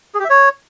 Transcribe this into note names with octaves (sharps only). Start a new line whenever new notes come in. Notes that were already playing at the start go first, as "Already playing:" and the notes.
G#4
G4
E5
C#5